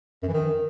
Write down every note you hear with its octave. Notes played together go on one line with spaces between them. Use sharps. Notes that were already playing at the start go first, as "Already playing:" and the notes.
F#2
E3
D#3